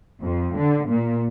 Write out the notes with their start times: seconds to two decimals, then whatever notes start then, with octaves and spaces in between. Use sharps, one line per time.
0.23 F2
0.57 D3
0.88 A#2